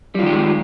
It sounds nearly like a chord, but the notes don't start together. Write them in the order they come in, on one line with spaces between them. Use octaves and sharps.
G3 F4 D#3 G4 G#3